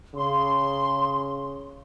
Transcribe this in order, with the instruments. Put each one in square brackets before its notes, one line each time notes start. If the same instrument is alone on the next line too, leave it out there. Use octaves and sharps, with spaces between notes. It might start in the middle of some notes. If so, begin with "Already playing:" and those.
[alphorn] C#3 [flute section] C6